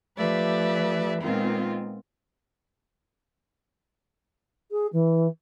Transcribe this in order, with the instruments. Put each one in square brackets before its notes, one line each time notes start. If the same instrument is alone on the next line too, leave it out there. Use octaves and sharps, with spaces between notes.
[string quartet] F3 A3 G4 B4 D5 E5
A#2 D#3 G#3 B3 C4 F4
[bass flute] G#4
E3